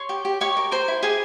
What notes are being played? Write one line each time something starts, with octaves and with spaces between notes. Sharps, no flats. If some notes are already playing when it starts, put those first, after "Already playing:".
Already playing: C#5 C6
G4
G4
G4 C#5 C#6
A#4
A#4 C5 C6
E4
G4 G#4 G#5